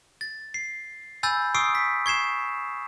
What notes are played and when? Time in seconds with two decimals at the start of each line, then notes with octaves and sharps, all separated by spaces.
0.21 A6
0.54 C7
1.23 G#5 B5 E6 G6 A6
1.55 C#6 D#6 E6 C7 D7
1.75 B6
2.06 C#6 G#6 C7 E7